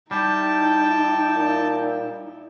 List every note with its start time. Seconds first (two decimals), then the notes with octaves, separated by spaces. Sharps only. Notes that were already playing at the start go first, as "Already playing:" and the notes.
0.11 G3 D#4 E4 G5 A5
1.36 A#2